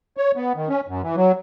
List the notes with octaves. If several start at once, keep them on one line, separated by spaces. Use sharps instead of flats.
C#5
B3
D#3
C#4
F#2
E3
F#3